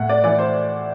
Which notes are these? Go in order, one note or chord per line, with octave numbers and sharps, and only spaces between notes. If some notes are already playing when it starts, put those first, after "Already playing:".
Already playing: A2 F#5
D5
E3 D5
C5